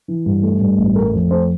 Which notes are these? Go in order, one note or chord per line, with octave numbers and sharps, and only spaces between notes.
E3
G2
A3
G2
A1
A3 A#4
F2
A3 C5